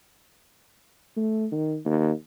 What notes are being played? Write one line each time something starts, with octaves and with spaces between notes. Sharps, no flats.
A3
D#3
D#2